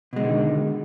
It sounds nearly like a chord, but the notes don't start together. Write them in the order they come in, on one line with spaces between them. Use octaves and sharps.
B2 G#3 D3 D#3